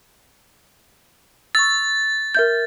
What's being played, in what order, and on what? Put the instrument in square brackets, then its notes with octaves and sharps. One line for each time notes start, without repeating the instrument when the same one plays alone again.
[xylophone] C#6 E6 [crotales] A6
[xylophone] A#4 E5 G6